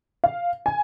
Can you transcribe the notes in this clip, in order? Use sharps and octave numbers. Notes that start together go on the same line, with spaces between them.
F5
G#5